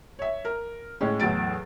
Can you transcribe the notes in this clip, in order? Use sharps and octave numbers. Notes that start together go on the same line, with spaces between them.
C#5 E5
A#4
A2 G#3 C#4
E2 A2 F#3 A6 D7